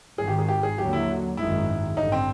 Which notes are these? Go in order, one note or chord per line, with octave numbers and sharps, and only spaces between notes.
G#1 G#2 D#3 G#4
G4
G#4
G4
G#4
D#2 D3 F#3 G4
E4
G#1 F#2 D#3 G#3 E4
A1 G2 D3 D#4
C4